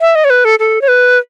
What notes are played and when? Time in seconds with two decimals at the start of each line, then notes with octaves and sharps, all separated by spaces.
0.01 E5
0.15 D#5
0.25 C#5
0.30 B4
0.45 A4
0.59 A4
0.82 C#5
0.88 B4